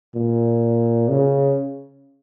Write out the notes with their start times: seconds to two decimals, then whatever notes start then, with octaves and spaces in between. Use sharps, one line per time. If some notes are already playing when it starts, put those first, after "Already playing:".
0.15 A#2
1.09 C#3